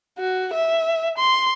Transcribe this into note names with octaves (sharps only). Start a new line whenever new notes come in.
F#4
E5
C6